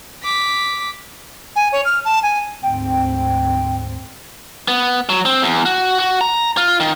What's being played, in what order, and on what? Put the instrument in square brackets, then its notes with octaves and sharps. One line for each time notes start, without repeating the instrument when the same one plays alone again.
[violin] D6 B6
[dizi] G#5
C#5
F6
A5
G#5
[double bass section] D2 G#2 C4 [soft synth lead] G5
[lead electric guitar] B3
F#3
C4
E2
F#4
F#4
A#5
F4
D#3